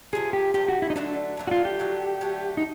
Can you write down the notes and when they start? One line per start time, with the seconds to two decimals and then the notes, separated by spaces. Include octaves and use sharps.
0.13 C3 F3 A3 G#4
0.33 G4
0.54 C3 F3 A3 G4
0.68 F#4
0.82 E4
0.90 D#4
0.96 D3 F#3 A3 D4
1.37 D3 F#3 A3
1.47 F#4
1.51 F4
1.65 G4
1.79 D3 F#3 A3
2.21 D3 F#3 A3
2.57 D#4